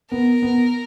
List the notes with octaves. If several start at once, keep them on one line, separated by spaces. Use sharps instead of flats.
B3 A#4
B3